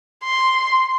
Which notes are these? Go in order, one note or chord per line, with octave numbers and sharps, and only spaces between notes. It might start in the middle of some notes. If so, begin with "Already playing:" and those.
C6